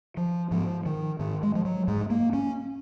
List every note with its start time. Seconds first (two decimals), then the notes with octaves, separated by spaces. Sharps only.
0.17 F3
0.51 G#2 F3
0.86 D#3
1.19 G#2 D#3
1.43 G#3
1.55 F3
1.65 F#3
1.88 G#2 G#3
2.10 A#3
2.33 C#4